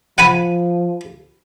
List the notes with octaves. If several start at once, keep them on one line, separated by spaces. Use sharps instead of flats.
F3 F#5 G#5 B5